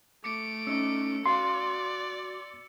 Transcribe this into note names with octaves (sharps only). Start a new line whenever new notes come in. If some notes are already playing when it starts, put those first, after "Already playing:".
A3 D6 C#7 D7
C#4 D#4 E6 C#7
F#4 D5 F5 C6